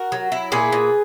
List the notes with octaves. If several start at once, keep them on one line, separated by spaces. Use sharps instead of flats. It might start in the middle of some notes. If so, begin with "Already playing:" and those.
Already playing: F#4 A#4
F#3
E4
A#2 G#4 B4
A#2